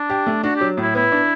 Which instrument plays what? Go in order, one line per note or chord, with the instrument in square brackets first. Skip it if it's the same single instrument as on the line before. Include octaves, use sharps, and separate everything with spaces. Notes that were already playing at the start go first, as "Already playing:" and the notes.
Already playing: [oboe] D4
[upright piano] G4
A3
[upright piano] D4 [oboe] F#4
[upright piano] F#3 [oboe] G4
[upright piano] A2 [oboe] E4
[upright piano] B3 [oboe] E4
[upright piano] D4